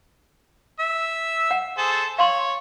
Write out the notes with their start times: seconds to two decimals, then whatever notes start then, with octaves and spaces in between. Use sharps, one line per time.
0.80 E5
1.51 F#5
1.78 G#4 A4 C5
2.18 C#5 F5 C6